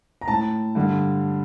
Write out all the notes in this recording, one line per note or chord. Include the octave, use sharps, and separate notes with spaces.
A#5
A2 A5
G2 D3